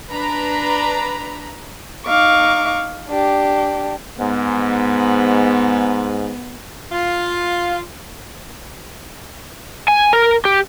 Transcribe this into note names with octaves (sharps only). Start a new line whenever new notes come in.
D4 B4 A#5 B5
D#4 F5 C#6 D6
D4 G4
G#2 B3
F4
G#5
A#4
G4